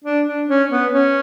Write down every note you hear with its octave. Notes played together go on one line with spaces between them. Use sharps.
D4
D4
C#4
B3
C#4